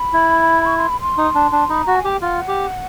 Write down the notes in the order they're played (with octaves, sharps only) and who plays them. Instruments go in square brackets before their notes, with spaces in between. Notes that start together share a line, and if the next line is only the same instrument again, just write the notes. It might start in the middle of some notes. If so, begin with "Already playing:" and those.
Already playing: [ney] B5
[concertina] E4
[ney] C#6
C6
B5
C6
[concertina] D#4
D4
D4
[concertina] D#4 [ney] B5
[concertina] F#4 [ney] A#5
[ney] G#5
[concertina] G4 [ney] G5
[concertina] F4 [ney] F#5
[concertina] G4